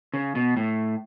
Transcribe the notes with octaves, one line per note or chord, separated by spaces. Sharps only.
C#3
B2
A2